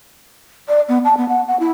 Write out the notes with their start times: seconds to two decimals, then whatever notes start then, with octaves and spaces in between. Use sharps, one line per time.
0.68 D5
0.89 B3
1.05 A5
1.17 B3
1.29 F#5
1.48 F#5
1.60 E4